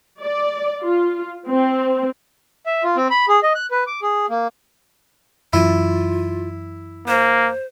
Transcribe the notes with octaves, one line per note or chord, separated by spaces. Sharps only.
D5
F4
C4
E5
F4
C4
B5
G#4
D#5
F#6
B4
D6
G#4
A#3
F#2 E3 F#3 E4 F4
A#3 C5